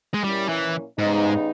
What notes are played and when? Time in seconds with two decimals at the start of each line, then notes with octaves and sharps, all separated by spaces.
0.14 G#3
0.24 A#2 G3 A#3 C#4 E4
0.49 E3
0.98 G#2 C#3 G3 B3 D#4